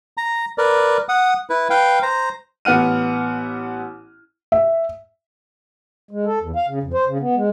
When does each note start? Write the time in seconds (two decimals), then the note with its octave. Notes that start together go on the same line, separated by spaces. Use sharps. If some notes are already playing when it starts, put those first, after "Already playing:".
0.17 A#5
0.58 A#4 B4 D5
1.09 F#5 D#6
1.50 E4 B4
1.70 B4 F5 G5
2.02 C5 A#5
2.65 A1 B3 F#5 F6 D#7
4.52 E5
6.11 G#3
6.26 A4
6.41 E2
6.56 F5
6.68 C#3
6.83 F2
6.94 C5
7.08 C#3
7.21 B3
7.36 G#3